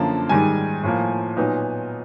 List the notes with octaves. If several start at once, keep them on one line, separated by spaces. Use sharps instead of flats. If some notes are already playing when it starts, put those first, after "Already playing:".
Already playing: F#2 D3 F3 A#3 A5
G#2 D#3 G3 G#5
A2 F3 A#3
A#2 F#3 B3 D#4